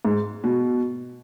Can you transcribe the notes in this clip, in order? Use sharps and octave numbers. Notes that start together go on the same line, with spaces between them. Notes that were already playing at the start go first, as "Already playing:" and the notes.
G#2
B2